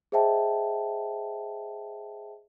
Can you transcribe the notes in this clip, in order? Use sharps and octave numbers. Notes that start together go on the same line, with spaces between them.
G#4 C5 D#5 E5 G5 A5